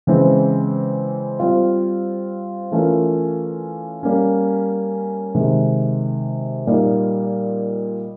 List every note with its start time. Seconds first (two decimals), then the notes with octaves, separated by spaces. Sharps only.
0.07 C#3 E3 G#3 C4
1.39 G3 C4 F4
2.72 E3 A3 C#4 F4 A#4
4.03 G3 A#3 C#4
5.35 C3 D#3 G#3
6.67 A#2 G3 A#3 D#4